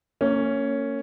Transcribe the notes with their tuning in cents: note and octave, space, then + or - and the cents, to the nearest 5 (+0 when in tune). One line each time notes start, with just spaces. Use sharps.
A#3 -35 C#4 +0